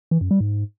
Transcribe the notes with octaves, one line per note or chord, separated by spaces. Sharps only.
E3
F#2
G3
G#2